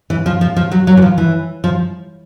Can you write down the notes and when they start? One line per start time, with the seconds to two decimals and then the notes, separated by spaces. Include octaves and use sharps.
0.10 E3
0.26 F3
0.41 F3
0.56 F3
0.71 F#3
0.87 F#3
0.97 E3
1.02 F3
1.18 E3
1.64 F3